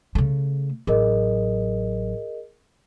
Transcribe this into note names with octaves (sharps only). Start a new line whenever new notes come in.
C#3 A3
A1 F#3 G#4 A#4 D#5